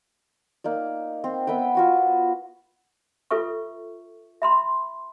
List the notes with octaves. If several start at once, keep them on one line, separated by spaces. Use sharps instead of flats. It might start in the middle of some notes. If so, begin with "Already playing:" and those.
A#3 D#4 D5
C4
B3 B4 E5 G5
F4 F#4 C#6
F4 A4 B4 E5 C#6
E5 B5 C6